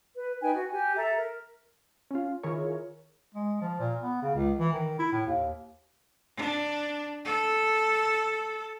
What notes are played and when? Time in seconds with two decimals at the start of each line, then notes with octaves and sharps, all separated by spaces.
0.15 B4
0.42 D#4 B4 G5 G#5
0.54 F#4
0.71 G4 G#5
0.96 A4 E5 A#5
1.17 A#4
2.11 C#4 F4
2.43 D#3 E4 F4 G#4 A#4 C#5
3.35 G#3
3.61 F3
3.79 A#2
4.02 B3
4.22 C#3
4.35 C#2
4.59 E3
4.73 D#3
4.99 E4
5.12 A2
5.27 D#2
6.37 D4
7.25 A4